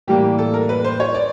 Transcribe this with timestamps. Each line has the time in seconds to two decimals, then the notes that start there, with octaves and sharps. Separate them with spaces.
0.08 A2 E3 G3 A#3 G4
0.39 A4
0.54 A#4
0.69 B4
0.84 C5
1.00 C#5
1.15 D5